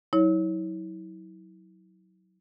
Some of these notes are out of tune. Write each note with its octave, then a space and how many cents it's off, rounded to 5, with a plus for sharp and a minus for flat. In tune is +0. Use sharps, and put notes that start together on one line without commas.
F#3 +0 E4 -35 C#5 +0